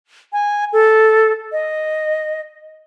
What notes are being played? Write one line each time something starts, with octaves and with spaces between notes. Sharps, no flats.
G#5
A4
D#5